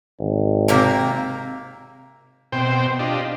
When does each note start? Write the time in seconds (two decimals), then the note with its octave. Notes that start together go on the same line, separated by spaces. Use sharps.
0.20 G#1
0.68 C3 A#3 A#5
2.52 B2 C4 C5 G5
2.99 D4 F4 G4 D#5